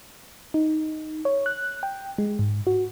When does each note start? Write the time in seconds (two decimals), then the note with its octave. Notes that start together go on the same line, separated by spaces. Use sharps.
0.54 D#4
1.25 C#5
1.46 F#6
1.83 G5
2.18 G#3
2.39 G#2
2.67 F#4